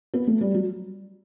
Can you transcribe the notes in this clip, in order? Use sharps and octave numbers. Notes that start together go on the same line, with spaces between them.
B3
A3
G3
F#3